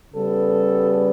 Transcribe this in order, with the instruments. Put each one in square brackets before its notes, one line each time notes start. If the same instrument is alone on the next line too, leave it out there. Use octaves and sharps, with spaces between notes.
[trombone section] C#3 G3 B3 A4